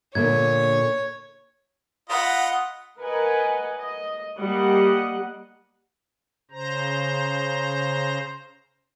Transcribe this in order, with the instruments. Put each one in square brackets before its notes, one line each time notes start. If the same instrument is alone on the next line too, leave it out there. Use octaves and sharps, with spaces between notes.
[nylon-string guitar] A#2 D3 A#3 [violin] C#5 [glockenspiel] G#6
[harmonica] F4 D#5 B5 [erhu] F#5
[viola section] A#4 B4 D#5 F#5 G#5
D#5
G3 A#3 D#5 F#5
[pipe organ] C#3 C5 A#5